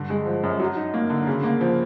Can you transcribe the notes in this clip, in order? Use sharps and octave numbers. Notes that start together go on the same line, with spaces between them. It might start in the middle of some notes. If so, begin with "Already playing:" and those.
Already playing: G2 D3
G#3
F3
F#2
F#3
D#4
A#3
D3
C#3
A#3
F3